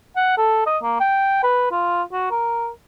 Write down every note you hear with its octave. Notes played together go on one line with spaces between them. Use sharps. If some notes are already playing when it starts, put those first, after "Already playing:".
F#5
A4
D#5
A#3
G5
B4
F4
F#4
A#4